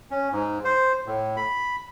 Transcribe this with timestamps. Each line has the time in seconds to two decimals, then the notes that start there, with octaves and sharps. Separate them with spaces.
0.11 C#4
0.32 G#2
0.65 C5
1.06 A2
1.37 B5